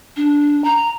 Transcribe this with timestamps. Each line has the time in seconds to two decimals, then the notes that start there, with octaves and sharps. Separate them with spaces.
0.16 D4
0.64 A#5